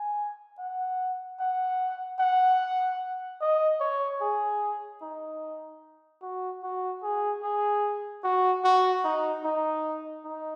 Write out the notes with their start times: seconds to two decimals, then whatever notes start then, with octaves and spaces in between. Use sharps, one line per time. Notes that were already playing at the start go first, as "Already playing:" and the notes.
Already playing: G#5
0.59 F#5
1.40 F#5
2.20 F#5
3.41 D#5
3.80 C#5
4.21 G#4
5.02 D#4
6.22 F#4
6.63 F#4
7.03 G#4
7.43 G#4
8.24 F#4
8.64 F#4
9.04 D#4
9.44 D#4
10.25 D#4